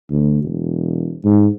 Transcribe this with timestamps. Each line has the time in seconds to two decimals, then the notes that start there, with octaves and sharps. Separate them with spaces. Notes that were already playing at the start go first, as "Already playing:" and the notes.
0.11 D2
0.44 E1
1.25 G#2